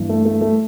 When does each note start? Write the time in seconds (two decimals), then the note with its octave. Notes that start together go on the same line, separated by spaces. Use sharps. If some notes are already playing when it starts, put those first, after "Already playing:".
Already playing: G2 E3
0.09 A3
0.25 A3
0.41 A3